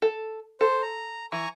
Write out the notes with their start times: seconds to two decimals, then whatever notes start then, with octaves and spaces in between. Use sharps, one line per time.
0.02 A4
0.61 A4 C5
0.82 A#5
1.32 E3 G#5 A#5 C#6